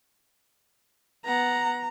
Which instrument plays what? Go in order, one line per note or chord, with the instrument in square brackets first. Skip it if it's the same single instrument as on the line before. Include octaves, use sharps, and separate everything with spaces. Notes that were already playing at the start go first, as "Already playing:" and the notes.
[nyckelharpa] B3 F#5 [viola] A#5